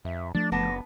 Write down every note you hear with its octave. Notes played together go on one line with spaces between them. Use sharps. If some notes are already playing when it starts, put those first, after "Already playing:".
F2 E5
F3 A3 D4 A6
F#1 B3 D4 A5 A#6